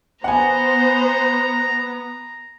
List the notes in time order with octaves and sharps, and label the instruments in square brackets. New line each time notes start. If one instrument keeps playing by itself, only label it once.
[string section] B3 [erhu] C5 [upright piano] F#5 G#5 [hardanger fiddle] A#5